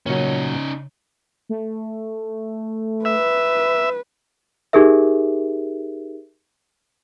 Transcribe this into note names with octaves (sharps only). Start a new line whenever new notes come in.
A#2 C#3 F#3 C#4 D#4
A3
B4 E5
D#4 G4 G#4 A#4 E5